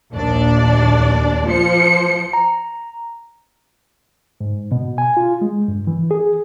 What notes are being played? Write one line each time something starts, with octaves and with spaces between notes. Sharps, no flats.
A#1 D#2 D4 D5
F3 C5 C#7
A#5
G#2
B2
G#5
F4
G#3
G2
E3
G#4